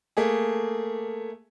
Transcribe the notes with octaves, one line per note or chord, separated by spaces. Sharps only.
A3 A#3 G#4